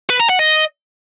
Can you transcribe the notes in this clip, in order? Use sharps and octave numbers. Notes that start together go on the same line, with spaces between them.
B4
A#5
F#5
D#5